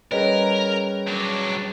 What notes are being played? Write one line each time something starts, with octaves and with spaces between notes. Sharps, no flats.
G3 C#4 G#4 A#4 B4 D#5
F#3 D4